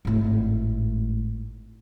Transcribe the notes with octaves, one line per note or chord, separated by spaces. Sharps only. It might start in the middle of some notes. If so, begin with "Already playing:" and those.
G#1 A2